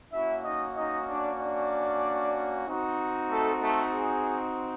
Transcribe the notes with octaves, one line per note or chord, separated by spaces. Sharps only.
A#3 C#4 E4 F#4 E5
D#4 D#5
D#4 D#5
D4 D5
D4 D5
C4 D#4 F#4
A3 A4
A3 A4
G#4